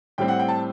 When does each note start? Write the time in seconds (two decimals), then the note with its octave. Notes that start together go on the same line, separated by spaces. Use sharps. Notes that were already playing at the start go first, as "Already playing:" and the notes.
0.18 A2 G3 C4 G5
0.28 F#5
0.39 G5
0.48 A5